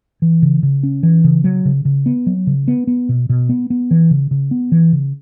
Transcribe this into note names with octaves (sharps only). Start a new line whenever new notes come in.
E3
C#3
C#3
C#4
E3
C#3
F#3
C#3
C#3
B3
F#3
C#3
B3
B3
B2
B2
B3
B3
E3
C#3
C#3
B3
E3
C#3